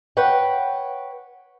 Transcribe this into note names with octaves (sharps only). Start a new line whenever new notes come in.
B4 C#5 F#5 G5